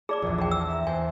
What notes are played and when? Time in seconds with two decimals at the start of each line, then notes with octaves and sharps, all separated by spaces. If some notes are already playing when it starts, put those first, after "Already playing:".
0.09 G#4 D5 A5 D6
0.22 A#1 E2
0.38 G#4 C5 D5 G5 A5
0.51 E6
0.68 E5 A#5
0.87 E2 C5 G#5 A6